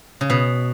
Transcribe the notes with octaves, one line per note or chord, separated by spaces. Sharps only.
C#3
B2